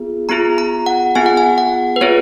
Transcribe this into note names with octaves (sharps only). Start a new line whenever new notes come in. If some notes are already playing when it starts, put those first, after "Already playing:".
Already playing: B3 F4 G#4
B3 F4 G#4 A#5
A#5
F#5
B3 F4 G#4 G#5
F#5
G#5
F#5
B4
B3 F4 G#4 C#5